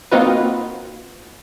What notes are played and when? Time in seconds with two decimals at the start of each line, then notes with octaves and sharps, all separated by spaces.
0.11 A#3 C4 D#4 F4 F#4 B4